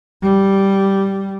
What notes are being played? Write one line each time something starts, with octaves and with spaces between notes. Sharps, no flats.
G3